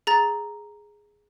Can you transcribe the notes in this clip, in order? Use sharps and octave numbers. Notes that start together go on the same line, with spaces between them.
G#4 A#5 A6